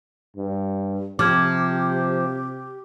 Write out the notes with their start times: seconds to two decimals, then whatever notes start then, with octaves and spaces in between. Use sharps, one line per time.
0.36 G2
1.19 C3 F3 G4 D6 F6 G#6